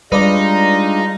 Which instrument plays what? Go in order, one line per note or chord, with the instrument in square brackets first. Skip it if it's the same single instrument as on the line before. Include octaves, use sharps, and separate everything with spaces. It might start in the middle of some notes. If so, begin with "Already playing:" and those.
[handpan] G3 [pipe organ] G#3 D4 F4 [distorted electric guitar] D#4 [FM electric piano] B4 D5 A#5